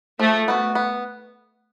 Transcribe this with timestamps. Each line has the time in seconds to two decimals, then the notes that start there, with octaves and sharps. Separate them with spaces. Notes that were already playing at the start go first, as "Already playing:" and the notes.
0.19 F3 A3
0.48 B3 F#4
0.75 B3